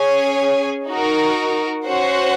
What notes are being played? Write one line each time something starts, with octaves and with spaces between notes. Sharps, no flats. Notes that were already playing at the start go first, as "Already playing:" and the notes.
Already playing: C#4 G#4 C#5 G#5
D#4 F#4 A#4
C#4 F#4 C5 F#5